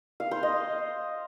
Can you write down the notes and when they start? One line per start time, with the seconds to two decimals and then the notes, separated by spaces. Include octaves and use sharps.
0.20 F5
0.31 C5
0.43 D#5